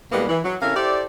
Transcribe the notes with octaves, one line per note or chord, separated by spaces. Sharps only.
E2 B2 G3 G#3 A#3 B3
E3
F#3
C3 C#4 E4 A4 A#4 F5
E4 G4 A4 C5 D5